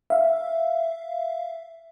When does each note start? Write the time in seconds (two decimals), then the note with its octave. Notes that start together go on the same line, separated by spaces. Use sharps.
0.10 E5 F5